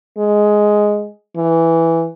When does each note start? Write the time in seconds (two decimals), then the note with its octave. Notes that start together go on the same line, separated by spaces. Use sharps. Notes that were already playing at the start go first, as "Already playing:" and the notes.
0.18 G#3
1.36 E3